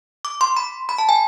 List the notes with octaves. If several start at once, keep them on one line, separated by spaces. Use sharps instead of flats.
D6
C6
B5
B5
A5
G#5